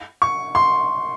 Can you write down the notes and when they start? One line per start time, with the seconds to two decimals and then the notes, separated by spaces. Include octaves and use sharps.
0.22 C#6
0.55 C6